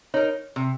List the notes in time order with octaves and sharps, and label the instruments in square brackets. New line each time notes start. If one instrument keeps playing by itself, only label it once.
[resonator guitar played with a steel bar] D#4 A#4 [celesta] C#5
[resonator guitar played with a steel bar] C3